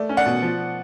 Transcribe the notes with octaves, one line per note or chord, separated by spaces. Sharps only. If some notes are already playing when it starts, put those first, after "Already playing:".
Already playing: A3 D5
C#4
D5 F#5
B2
F3